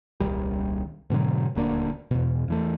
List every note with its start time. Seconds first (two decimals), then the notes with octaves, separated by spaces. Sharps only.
0.20 D#1 C2 D#3 G3
1.10 G#2 B2 D3 F#3
1.55 D#1 D2 A#3 D4
2.11 E2 B2
2.48 E2 E3 A3